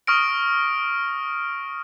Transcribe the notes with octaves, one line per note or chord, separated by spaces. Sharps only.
C#6 D#6 F6 A#6 D7